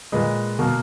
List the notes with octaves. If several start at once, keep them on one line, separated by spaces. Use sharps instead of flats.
A#2 G#3 B4 D#5
B2 A#3